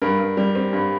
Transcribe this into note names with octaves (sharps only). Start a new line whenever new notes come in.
G2 A#4
G2
G3
C4
G2